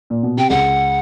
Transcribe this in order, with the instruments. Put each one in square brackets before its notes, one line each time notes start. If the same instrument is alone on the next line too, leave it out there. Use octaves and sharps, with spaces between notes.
[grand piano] A#2
B2
[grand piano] C3 [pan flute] G5
[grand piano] C#2 C#3 [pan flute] F#5